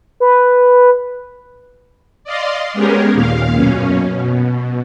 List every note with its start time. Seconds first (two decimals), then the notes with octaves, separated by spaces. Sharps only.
0.20 B4
2.24 D5 D#5 F5 C6
2.73 G#3 B3 C#4 G4 G#4 A#4
3.12 D#2 A#2 F5
3.55 F#2 B2 C#4
4.13 B2